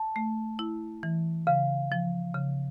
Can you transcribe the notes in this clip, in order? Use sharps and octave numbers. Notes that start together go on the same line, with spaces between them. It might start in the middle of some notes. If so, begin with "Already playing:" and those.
Already playing: A5
A3
E4
E3
C#3 F5
F3
C#3